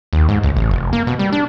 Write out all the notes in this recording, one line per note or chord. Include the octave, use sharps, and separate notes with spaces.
D#2
G#2
C#2
A1
F1
A#3
B2
G3
D4